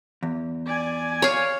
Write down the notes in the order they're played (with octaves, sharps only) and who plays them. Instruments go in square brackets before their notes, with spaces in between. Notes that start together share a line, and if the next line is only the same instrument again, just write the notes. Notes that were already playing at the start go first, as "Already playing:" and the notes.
[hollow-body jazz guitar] E2
[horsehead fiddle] D5 G#5
[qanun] C#5 F5